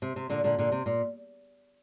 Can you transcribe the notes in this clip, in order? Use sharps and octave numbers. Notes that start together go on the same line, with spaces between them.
C3
C3
A#2 D3
A#2 D3
A#2 D3
C3
A#2